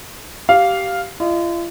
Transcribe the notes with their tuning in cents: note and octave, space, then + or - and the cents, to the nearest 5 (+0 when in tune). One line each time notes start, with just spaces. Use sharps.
G4 -20 F5 +0
F4 -40 D#5 -25